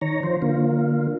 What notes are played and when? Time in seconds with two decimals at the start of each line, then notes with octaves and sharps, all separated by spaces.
0.01 D#3 C#5 A#5
0.23 F3 C5
0.42 D3 A#3 F4